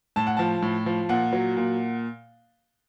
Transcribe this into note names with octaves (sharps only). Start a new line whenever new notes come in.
A2 A5
F#5
F3 A5
A2
F3
A#2 F#5
F#3
A#2